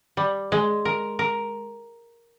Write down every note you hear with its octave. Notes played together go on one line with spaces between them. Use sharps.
G3
G#3
A#4
A#4